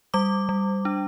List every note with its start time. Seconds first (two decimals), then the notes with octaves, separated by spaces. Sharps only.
0.14 G3 D6
0.49 G3
0.85 D4